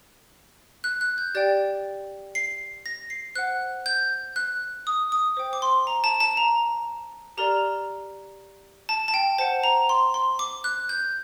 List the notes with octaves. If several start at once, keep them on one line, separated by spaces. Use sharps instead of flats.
F#6
F#6
G6
G4 D5 G5 A6
C7
A#6
C7
C5 F#5 F#6
G6
F#6
D#6
D#6
C5 G5
D6
C6
A#5
A5
A5
A#5
G4 A#4 D5 A#5
A5
A5
G5
C5 F#5 A5
A#5
C6
C6
D6
F#6
G6